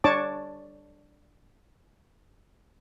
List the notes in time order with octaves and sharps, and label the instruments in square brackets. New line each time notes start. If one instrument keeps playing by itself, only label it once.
[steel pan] D4 C#5 A5 D6